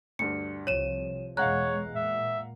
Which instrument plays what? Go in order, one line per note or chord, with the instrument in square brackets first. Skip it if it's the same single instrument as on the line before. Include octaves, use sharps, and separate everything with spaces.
[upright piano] D2 G2 [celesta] C#7
[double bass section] C2 C3 F3 [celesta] C#5 E7 [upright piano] D#7
[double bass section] E2 B2 G#3 [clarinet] C#5 [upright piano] F5 F#5 A#5 [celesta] F#6
[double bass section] A#2 [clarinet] E5